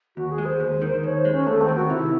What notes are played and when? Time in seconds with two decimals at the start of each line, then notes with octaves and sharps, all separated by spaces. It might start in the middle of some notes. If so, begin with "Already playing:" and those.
0.17 D#2 F#4
0.31 G#4
0.38 G#3
0.45 C5
0.60 D#2
0.82 D#3
1.03 D#2 C#5
1.18 C5
1.25 G#3
1.32 C#4
1.47 D#2 A3
1.61 C4
1.69 D#3
1.75 F#4
1.90 C3 E4